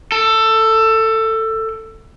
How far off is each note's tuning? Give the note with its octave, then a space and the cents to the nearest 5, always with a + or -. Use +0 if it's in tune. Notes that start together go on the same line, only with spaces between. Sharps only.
A4 +15